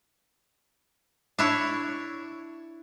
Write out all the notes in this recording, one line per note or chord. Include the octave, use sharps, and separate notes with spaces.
D4 E4 C#5